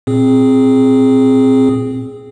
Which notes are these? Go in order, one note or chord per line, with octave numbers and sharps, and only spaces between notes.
A#2 C4 G#4